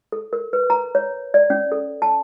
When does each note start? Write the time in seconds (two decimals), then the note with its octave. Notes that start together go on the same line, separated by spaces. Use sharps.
0.12 A4
0.33 A#4
0.53 B4
0.70 A#5
0.95 C#5
1.34 D5
1.50 C#4
1.72 A4
2.02 A5